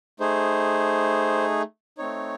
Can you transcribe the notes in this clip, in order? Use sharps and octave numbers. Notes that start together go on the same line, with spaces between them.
A3 D#4 G#4 C5
A3 C4 D#4 C#5